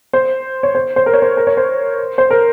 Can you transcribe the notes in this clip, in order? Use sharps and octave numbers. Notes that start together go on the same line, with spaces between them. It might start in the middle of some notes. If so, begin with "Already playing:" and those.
C5
C#5
C5
C5
A#4
C#5
C5
A#4
C#5
C5
C5
A#4